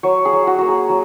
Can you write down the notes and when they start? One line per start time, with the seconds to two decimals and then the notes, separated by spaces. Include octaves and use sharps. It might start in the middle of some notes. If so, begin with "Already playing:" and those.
0.03 F#3 C#5
0.25 G#4
0.33 F#3
0.47 F#4
0.58 A#3 F#4
0.69 G#4
0.89 F#3